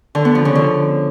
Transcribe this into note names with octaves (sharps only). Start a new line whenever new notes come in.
D3
B3
F3
C#3
D3